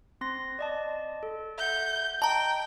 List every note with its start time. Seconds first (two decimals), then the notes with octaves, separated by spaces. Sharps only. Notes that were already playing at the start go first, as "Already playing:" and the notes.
0.21 C4 C6 A#6
0.59 D5 D#5 A5
1.23 A4
1.58 E5 F#5 G6
2.22 D#5 G5 A5 A#5